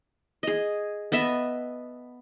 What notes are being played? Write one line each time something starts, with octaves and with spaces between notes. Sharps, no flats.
G#4 D#5
B3 D#5 E5 A5